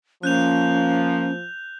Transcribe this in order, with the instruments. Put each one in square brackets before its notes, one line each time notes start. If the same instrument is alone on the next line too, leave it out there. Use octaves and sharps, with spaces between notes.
[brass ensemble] F3 [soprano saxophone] A#3 [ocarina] C#4 [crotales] F#6 G6 F7